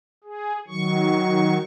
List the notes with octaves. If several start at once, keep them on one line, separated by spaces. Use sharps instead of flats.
G#4
D#3 F#3 C#6